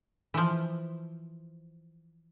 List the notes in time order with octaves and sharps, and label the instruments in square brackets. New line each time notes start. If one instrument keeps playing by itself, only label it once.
[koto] E3 F3